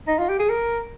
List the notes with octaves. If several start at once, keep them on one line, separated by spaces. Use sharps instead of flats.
D#4
F4
G4
G#4
A#4